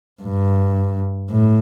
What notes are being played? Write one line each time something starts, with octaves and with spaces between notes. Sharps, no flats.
G2
A2